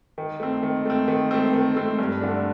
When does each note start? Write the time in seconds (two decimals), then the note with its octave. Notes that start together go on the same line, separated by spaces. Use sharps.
0.18 D#3
0.40 A3 C4
0.63 D#3
0.85 A3 C4
1.08 D#3
1.31 A3 C4
1.53 D#3
1.76 A3 C4
1.99 G2
2.21 D3 A3 D4